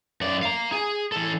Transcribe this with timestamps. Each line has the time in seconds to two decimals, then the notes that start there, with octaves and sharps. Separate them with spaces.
0.21 F#2 D5
0.43 F5 A#5
0.72 G#4
1.12 E3 A4